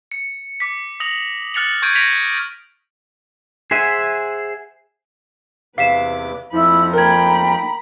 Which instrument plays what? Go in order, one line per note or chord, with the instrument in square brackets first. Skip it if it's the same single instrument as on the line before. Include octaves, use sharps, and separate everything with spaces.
[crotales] C#7
D6 B6
D#6 A#6 F7 F#7
F6 F#6 A6 C#7 F7 F#7
C#6 G6 G#6 D7 D#7
A#6 B6 D7 D#7 F7 F#7
[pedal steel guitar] G#4 C5 E5 F#5 G#5
[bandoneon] E2 C3 D6 [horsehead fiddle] B4 [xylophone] F5 B6 E7
[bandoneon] F2 F3 [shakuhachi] E4 [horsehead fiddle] B5
[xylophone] A#4 G#6 [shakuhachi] G5 [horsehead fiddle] A#5 B5